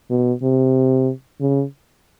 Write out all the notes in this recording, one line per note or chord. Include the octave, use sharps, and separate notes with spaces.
B2
C3
C#3